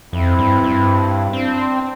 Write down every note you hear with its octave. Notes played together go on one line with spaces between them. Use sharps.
F2 C4 E4
G2
G2
C4 D4